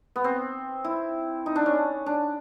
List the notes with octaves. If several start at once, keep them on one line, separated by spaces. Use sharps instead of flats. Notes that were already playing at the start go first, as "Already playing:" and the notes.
B3
C4
E4
D#4
D4
C#4
D4